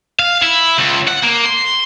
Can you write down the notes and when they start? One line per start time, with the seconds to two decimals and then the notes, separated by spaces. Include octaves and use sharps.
0.19 F5
0.43 E4
0.79 C#2
1.08 F#5
1.24 A#3
1.46 C6